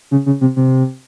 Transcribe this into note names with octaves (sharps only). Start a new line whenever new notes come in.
C#3
C#3
C3
C3